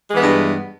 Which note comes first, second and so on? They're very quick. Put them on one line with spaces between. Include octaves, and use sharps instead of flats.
G#3 E3 B3 G2